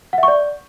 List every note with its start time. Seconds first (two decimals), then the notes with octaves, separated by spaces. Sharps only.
0.13 F#5
0.18 E5
0.23 C#6
0.28 D5